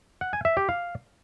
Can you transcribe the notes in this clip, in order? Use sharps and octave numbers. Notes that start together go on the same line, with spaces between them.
F#5
G#5
E5
G4
F5